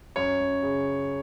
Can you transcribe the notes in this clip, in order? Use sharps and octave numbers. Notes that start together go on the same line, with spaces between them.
F#2 C#5
F#2
C#3